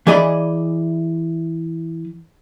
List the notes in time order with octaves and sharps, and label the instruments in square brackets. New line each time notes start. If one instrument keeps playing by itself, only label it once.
[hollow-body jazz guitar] E3 G#4 D5 D#5 B5